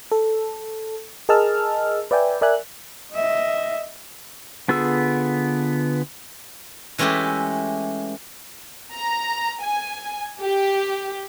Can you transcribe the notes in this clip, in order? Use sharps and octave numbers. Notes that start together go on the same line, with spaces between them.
A4
G#4 A#4 D#5 A5 E6 F6
B4 D5 E5 G5 G#5
A#4 D5 E5 G#5 F#6
D#5 E5
D3 B3 F4 G#4 E6
E3 G#3 A3 C#4 G4 E5
A#5
G#5
G4